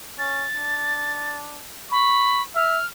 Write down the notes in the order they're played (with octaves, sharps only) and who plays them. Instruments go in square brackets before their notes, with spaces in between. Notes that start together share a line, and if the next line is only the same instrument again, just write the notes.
[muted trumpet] C#4 [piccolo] A6
[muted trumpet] D4
[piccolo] B5 [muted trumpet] C#6
[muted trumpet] E5 [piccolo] F6